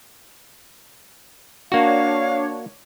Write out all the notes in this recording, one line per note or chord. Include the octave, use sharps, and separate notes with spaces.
A#3 D4 F#4 C#5 F5